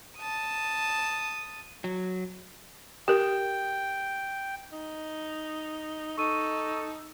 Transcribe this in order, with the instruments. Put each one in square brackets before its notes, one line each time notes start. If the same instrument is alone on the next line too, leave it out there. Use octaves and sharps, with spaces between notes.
[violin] A5 D#6
[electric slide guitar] F#3
[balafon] G4 A#4 [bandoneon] G5
[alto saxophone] D#4
[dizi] D#4 [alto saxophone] A4 [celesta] C#6 D#7